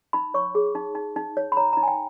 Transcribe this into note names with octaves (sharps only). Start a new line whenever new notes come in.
D#4 B5
C#5 C#6
G#4
D#4
D#4
D#4
C#5
B5
C#5 A#5
A#5
D#4
G#5
G5